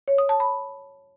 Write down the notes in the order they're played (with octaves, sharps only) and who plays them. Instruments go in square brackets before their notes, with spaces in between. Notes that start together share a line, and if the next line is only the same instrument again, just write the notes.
[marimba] C#5
D#6
A5
B5